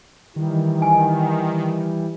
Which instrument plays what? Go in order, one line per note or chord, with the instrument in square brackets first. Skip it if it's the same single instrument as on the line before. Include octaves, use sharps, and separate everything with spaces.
[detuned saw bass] D#3 [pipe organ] E3 G3
[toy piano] G#5